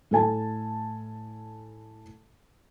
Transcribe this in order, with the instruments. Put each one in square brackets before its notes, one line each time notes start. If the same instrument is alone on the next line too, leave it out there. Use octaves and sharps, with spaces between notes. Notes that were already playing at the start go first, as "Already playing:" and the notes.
[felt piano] A2 A4 G#5 A5